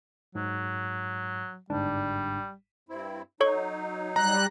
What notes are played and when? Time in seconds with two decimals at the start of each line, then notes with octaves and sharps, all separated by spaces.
0.35 G#2 F#3
1.70 G1 G#2 G3 D4
2.89 G2 C4 E4
3.40 F#3 D#4 A4 C#5 C#6
4.16 G3 A#5 F#6